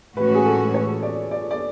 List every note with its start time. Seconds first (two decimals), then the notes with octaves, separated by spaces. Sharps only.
0.17 A2 E3 G#3 C#4 F#4 B4
0.35 G#4
0.45 A4
0.74 C#5
1.03 D5
1.31 D5
1.51 D5